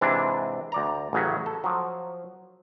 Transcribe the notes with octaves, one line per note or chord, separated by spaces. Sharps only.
G#2 C3 E3 D4
D2 D5 A#5
A1 C#3 F#3 C#4
A4
F3 F#3